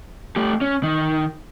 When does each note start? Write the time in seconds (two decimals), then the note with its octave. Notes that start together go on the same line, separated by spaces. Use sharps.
0.36 A3 G4
0.61 C#4
0.83 D#3